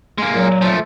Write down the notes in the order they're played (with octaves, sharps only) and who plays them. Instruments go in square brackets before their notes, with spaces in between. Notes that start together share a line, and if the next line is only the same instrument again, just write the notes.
[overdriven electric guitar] G#3 A#3
[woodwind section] A#2 F#3
[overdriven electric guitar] F3 A3